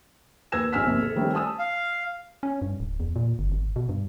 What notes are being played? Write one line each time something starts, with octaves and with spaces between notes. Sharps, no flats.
D#2 B4 E6 G#6 A#6 E7
G#1 G#5 E6 F6 B6
D#2 C3
A4
D#3 G3 A3 C4 C#4
G#5 A5 D#6 E6
F5
C#4
G2
D1
E2
A#2
G1
G#1
B2
G2